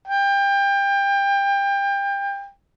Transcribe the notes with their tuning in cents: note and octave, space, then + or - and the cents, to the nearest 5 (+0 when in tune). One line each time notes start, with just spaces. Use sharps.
G5 +25